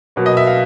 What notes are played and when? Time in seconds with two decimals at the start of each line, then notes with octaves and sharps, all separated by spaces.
0.16 B2 F#3 A#3
0.26 D#5
0.37 E5
0.47 F5